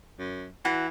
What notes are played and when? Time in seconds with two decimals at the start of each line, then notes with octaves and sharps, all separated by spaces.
0.19 F#2
0.65 E3 F#4